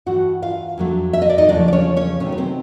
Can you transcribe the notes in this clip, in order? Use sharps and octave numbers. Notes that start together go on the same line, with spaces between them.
G2 E3 A3 F#4 F#5
F4 F5
F2 D3 F#3 A3
E5
D#5
D5
D#4 D#5
E2 C#3 F3 A3 D4 D5
D5
C#4 C#5
C#4 C#5
C3 D#3 F#3 A3 C#4 C#5
B4
C4 C5